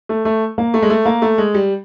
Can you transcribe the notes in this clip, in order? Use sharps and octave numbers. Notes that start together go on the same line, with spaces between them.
A3
A3
A#3
A3
G#3
A3
A#3
A3
G#3
G3